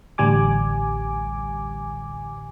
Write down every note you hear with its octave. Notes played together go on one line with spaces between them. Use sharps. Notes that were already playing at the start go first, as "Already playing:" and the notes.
A1 D2 G3 G#5 D6